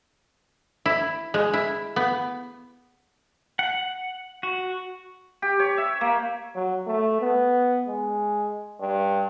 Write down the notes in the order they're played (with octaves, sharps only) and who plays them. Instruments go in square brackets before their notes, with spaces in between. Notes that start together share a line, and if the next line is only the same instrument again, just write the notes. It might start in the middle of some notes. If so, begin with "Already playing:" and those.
[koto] E4
G#3
E4
B3
[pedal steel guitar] F#5
F#4
[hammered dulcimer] G4
C#5
E5
A#3
[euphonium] F#3
A3
B3
G#3
G2